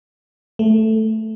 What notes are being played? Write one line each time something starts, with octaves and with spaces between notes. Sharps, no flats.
A3